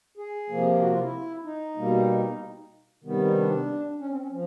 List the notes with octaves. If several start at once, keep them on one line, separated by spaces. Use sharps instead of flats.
G#4
C3 F3 A#3
F#4
F4
E4
D#4
B2 G3 A#3
C3 D#3 G3 B3
D#4
D4
C#4
C4
C#4
F3